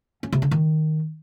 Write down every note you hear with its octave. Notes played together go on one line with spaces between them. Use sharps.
C#4
C3
D3
D#3